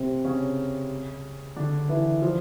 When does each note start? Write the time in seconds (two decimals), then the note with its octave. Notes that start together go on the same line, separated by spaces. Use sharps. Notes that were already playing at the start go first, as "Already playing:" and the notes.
Already playing: C3 C4
0.25 C#3 C#4
1.56 D3 D4
1.89 E3 E4
2.22 F3 F4